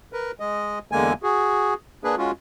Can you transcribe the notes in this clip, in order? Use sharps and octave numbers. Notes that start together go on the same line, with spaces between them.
A#4 B4
G#3 D#5
E2 D3 G#3 A#3 G#5
F#4 G#4
A#3 D4 G#4 B4
G#3 C#4 F4 F#4